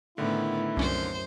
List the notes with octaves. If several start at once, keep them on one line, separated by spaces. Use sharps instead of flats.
A2 D3 D#3 B3 E4
C2 F#2 C#4 C5 D5